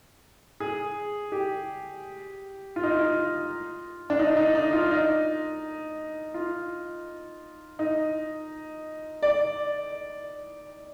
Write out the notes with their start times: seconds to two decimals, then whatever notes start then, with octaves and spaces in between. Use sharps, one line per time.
0.60 G#4
1.32 G4
2.76 F4
2.83 D#4
2.92 F4
4.10 D4
4.19 D#4
4.37 D#4
4.55 D#4
4.73 F4
4.91 D#4
6.34 F4
7.79 D#4
9.23 D5